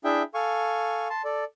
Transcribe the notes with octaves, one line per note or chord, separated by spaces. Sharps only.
D4 E4 G#4 E5 G5
A4 F5 G#5 C#6
A5 C6
A4 D5